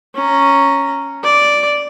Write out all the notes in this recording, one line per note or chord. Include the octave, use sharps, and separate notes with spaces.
C#4 A#5
D5